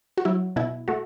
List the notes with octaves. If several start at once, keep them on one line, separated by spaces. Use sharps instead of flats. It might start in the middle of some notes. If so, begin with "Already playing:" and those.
F#4
F#3 E4
B2 E4
A3 F#4